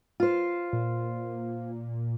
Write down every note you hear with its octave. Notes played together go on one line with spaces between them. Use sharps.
F4 C5
A#2